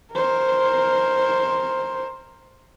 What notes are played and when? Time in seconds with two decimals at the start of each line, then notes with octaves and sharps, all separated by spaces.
0.13 A#4 C5